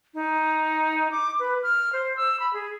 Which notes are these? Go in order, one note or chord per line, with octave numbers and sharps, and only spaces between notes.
D#4
D6
B4
F6
C5
E6
B5
G#4